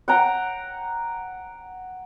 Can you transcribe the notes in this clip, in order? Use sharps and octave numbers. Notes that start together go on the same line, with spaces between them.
F#5 G5 A#5